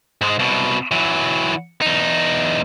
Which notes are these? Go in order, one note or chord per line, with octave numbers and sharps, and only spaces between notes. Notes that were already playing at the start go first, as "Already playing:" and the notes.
G#2 G#3
C2 B2
E3 F#3
E2 D#4